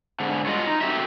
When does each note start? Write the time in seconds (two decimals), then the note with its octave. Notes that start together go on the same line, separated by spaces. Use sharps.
0.20 G#2 D3
0.46 F#3 F4 D#5
0.67 D#4
0.81 A3 C4 F#4 G4 D#5 E5